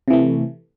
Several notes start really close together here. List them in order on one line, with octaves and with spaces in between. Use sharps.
C3 E3 A3